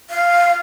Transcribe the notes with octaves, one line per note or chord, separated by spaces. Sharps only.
F5